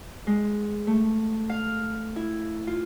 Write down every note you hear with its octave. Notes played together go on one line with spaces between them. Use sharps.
G#3
A3
F5
E4
F4